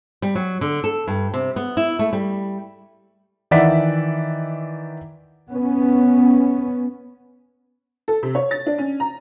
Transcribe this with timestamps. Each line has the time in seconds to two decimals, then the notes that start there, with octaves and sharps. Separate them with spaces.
0.22 G3
0.35 F#3
0.61 D3
0.84 A4
1.07 G2
1.34 C3
1.56 B3
1.77 E4
1.99 A3
2.13 G3
3.51 D#3 E3 D5 E5 F#5 B6
5.50 B3 C#4
8.08 A4
8.23 C3
8.35 C#5
8.51 A6
8.66 D4
8.78 C#4
9.00 A#5